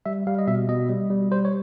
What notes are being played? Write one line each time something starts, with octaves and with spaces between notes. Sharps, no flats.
G3 E5
G3 F5
D#5
B2 E5
B2 D#5
G3
G3
G3 C5
C#5